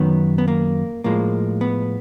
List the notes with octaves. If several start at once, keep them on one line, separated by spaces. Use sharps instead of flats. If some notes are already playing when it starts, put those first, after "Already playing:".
Already playing: F#2 D#3 F#3 B3
B3
A#3
A2 F3 G#3 A#3
B3